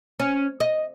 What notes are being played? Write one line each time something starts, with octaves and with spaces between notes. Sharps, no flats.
C#4
D#5